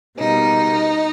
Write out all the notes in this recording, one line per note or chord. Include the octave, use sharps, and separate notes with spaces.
B2 G3 A#3 D#4